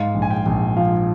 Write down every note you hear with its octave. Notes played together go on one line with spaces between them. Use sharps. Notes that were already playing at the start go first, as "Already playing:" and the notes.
Already playing: G#2 F5
A#1
G#5
G5
A#1
F3 F5